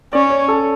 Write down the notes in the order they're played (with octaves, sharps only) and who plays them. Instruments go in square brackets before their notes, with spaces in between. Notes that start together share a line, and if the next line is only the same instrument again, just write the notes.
[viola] C#4 [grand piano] D5
[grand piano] C#5
A4